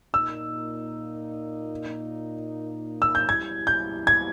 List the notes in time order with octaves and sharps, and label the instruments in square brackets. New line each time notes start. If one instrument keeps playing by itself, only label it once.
[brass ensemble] A#2 A#3 D#4 [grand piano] E6
[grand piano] E6
G6
[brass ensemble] B2 G3 C#4 E4 [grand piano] G#6
[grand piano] G6
G#6